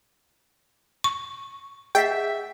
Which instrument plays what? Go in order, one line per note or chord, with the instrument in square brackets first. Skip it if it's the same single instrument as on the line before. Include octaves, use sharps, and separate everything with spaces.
[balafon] C#6
[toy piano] G#4 D#5 F#5 [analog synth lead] E5 [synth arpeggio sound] G5 B6